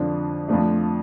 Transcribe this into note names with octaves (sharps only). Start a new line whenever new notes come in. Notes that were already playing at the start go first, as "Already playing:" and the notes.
Already playing: F2 D3 F3 D4
F2 F3 A3 D4